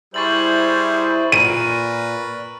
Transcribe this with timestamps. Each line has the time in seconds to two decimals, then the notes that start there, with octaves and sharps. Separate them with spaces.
0.14 G3 E4 G#4 C5 C#6 A6 F#7
1.32 A#2 A#4 B4 D#7